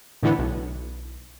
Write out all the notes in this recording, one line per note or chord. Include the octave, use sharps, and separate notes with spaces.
A2 D3 E3 B3
B1